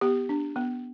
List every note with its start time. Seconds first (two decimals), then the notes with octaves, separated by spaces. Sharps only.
0.01 B3 G4
0.29 D4
0.56 B3